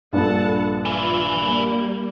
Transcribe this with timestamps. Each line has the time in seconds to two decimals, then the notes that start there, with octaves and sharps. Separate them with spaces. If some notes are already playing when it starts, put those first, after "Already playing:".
0.13 A#1 G2 A4 F#5 A5
0.85 E4 F4 G#5
1.42 G3 A#3